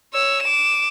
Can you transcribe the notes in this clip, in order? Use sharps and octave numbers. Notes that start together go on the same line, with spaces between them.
C#5 E6
D6 E7